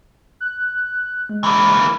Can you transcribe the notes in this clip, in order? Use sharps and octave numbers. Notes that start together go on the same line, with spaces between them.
F#6
G#3
E3 A#3